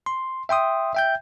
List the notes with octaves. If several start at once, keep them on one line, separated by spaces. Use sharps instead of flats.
C6
E5 G5 C6 D#6
E5 G5 G6